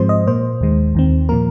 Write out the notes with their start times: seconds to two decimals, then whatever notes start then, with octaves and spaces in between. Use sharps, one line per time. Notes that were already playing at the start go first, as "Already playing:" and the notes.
Already playing: G#2 F3 G#3 C4 C5
0.09 D#5
0.27 A#2 A#3 C5
0.61 D#2 D#3 G#3
0.95 D#2 D#3 C4
1.29 A#2 F3 A#3 A#4